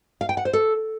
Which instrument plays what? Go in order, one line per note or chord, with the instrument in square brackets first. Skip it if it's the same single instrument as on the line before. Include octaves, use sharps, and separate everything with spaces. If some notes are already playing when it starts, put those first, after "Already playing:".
[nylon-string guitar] F5
G5
F#5
C5
A4